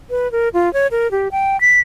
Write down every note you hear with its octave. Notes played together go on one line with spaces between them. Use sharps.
B4
A#4
F4
C#5
A#4
G4
G5
B6